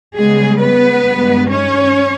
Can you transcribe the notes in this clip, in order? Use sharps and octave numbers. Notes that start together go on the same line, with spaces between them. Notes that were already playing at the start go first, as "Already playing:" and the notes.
C#3 G3 G#3 B3 G#4
B3 B4
G2 D#3 G#3
C#4 C#5